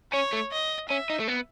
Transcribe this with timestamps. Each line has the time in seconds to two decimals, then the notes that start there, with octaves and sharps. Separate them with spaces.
0.12 C#4 C#5
0.33 A3
0.52 D#5
0.89 C#4 E5
1.10 D#4
1.20 A3
1.28 B3